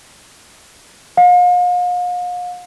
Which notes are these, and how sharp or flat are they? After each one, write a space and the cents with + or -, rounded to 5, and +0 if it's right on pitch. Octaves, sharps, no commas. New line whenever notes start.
F5 +40